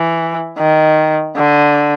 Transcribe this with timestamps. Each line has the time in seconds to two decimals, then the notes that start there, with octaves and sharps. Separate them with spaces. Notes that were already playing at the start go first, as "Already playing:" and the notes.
Already playing: E3
0.58 D#3
1.37 D3